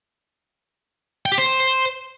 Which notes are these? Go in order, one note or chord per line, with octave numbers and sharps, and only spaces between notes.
G5
G4
C5